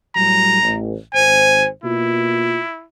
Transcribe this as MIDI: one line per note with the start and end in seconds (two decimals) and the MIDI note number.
0.16 0.59 45
0.16 0.59 54
0.16 0.59 55
0.16 0.76 82
0.62 0.95 33
1.14 1.66 32
1.14 1.66 72
1.14 1.67 80
1.84 2.60 47
1.84 2.60 58
1.84 2.84 64
1.84 2.60 65